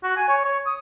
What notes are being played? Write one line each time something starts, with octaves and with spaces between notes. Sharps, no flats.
F#4
G#5
C#5
C#5
D#6